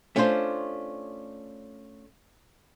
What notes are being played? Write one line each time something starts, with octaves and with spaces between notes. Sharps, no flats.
A3 C#4 D4 F4 C5